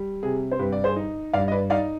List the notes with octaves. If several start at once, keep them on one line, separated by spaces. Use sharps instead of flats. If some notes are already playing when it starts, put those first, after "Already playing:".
Already playing: G3
C3 G#4
C5
G2 G4 B4
D5
G#4 C5
D#4
G2 D5 F5
D#5
B4 D5
D#4 D5 F5